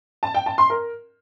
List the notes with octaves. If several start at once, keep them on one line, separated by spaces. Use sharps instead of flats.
A5
G5
A5
C6
A#4